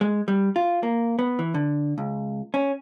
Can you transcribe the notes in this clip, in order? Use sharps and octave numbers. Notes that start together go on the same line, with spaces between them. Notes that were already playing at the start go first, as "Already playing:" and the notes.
G#3
G3
F4
A#3
B3
E3
D3
C#2
C#4